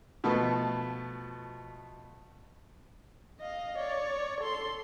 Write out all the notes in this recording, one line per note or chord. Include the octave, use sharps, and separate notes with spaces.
B2 F3 A3 B3
D#5 F5
C#5 D5
A4 C6